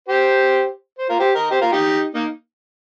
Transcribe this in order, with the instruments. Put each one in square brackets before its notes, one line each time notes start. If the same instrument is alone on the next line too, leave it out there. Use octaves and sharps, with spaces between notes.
[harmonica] G4 C5
C5
F4 A#4
G4 C5
A#4 D#5
G4 C5
F4 A#4
D#4 G4
A#3 D#4